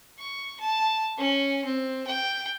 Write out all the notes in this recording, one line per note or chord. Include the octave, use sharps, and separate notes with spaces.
C#6
A5
C#4
C4
G5